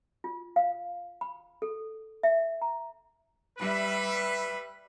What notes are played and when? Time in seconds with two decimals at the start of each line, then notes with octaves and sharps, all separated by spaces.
0.24 F4
0.56 F5
1.21 B5
1.62 A4
2.23 E5
2.62 A#5
3.58 G3 B4 E5